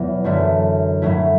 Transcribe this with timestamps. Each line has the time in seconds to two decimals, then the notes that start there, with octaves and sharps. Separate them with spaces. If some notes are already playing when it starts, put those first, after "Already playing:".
Already playing: E2 B2 F#3 B3 E4
0.24 F#2 D3 A3 E4
1.02 A2 F#3 A3 E4